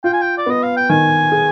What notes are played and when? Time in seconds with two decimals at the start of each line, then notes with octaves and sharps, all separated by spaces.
0.04 F4 G5
0.13 G#5
0.21 G5
0.38 D5
0.46 B3 D#5
0.63 F5
0.77 G5
0.89 D#3 G#5
1.32 G#4